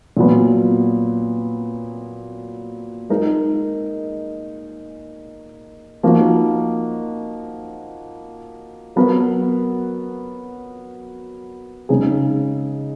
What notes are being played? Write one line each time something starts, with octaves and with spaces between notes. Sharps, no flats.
A#2 F#3 B3
G#3 D#4 A#4
F3 A#3 D#4 F#4 A#4
F#3 B3 F#4 A#4
C#3 G#3 D#4 G#4